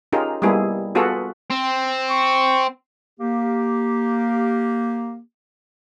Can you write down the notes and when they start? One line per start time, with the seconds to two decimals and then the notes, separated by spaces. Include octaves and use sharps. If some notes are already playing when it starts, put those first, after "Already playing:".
0.12 C#4 D#4 F4 G4 G#4 A#4
0.42 G3 G#3 A#3 B3 E4 G#4
0.95 B3 F4 F#4 G#4 A4 B4
1.50 C4
2.10 C#6
3.20 A#3 G4